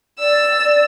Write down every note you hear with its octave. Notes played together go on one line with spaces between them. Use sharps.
D5 E6